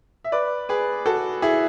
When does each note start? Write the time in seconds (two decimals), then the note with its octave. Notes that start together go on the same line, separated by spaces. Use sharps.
0.24 E5
0.32 B4 D5
0.69 G#4 B4
1.06 F#4 A4
1.42 E4 G#4